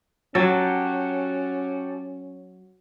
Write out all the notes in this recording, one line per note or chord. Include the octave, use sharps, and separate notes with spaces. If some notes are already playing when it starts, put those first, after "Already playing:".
F#3 C#4 F#4 G4 A4